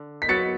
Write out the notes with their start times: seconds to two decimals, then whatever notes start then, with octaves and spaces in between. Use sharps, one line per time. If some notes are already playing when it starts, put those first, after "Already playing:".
Already playing: D3
0.22 B6
0.29 F#3 B3 F#4 A6 C#7